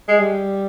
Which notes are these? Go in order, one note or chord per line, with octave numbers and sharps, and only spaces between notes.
G#3
G3